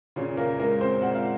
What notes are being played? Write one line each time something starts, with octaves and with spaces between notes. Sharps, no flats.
A#2 C#3 C#4
A#3 A#4
G#3 A#3 A#4
C4 C5
A#2 F#5
F5